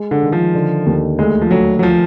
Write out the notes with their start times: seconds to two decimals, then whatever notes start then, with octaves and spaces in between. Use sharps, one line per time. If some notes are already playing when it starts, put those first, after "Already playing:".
Already playing: G#3
0.11 D3
0.23 D#3
0.32 F3
0.54 D3
0.86 D#2
1.18 D2 G#3
1.41 F3
1.51 D2 F#3
1.79 F#3
1.83 F3